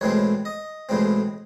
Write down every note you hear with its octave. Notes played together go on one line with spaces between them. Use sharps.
B1 A2 E3 G#3 C4 C#5
D#5
B1 A2 E3 G#3 C4